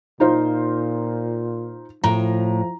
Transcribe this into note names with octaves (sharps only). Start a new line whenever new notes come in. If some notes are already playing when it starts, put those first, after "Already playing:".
A#2 D#4 F4 C5
A2 F3 A#5